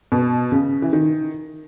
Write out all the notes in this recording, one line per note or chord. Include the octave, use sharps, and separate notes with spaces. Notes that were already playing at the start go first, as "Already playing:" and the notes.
B2
C#3
E3
D#3